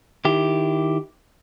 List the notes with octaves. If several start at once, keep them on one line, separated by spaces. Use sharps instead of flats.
D#3 E4 G4